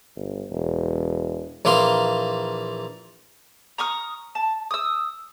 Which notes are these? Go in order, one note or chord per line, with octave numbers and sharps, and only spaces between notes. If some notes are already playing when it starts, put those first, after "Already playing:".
G1
E1
A#1 E3 A#3 F5 C6
A#5 C#6 D#6 F6
A5
D#6 E6